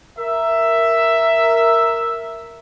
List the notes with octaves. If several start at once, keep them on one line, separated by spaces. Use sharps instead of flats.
A#4 E5